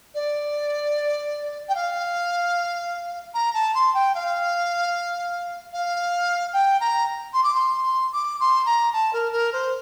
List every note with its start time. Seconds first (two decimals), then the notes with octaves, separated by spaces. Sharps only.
0.14 D5
1.68 G5
1.75 F5
3.34 A#5
3.54 A5
3.74 C6
3.94 G5
4.14 F5
5.73 F5
6.53 G5
6.80 A#5
7.33 C6
7.43 D6
7.54 C6
8.12 D6
8.40 C6
8.65 A#5
8.93 A5
9.13 A#4
9.32 A#4
9.52 C5